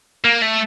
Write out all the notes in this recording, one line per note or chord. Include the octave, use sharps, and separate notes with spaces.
A#3
A3